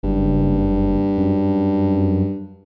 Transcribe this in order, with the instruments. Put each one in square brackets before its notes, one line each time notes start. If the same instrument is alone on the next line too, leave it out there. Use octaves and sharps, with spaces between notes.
[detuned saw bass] F#1 [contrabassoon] G2
[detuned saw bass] F#2